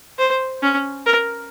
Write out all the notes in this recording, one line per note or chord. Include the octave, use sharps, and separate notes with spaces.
C5
C#4
A#4